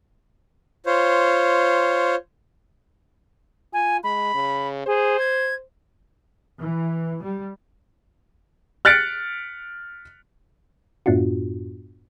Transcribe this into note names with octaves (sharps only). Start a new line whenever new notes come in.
F4 C5 C#5
F4 G#5
G#3 B5
C#3
G#4 C5
G#6
E3
G3
F6 F#6 A6 B6 C#7 D7
F#2 A2 B3 D4 F4 F#4